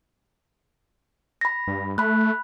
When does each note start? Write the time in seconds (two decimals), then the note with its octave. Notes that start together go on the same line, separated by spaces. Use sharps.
1.41 B5 A#6
1.67 G2
1.98 A3 B5 F#6